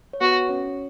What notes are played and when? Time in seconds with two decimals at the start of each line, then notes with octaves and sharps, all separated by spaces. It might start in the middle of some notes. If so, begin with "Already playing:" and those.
0.13 C#5
0.21 B3 F#4 B4
0.49 C#4 C#5